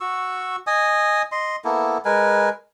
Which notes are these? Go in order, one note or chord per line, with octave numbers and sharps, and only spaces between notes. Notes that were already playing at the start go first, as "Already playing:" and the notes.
F#4 C#6 E6
D#5 G#5 D#6
D#5 C6
A#3 B3 E4 A4
G#3 A#4 B4 G#5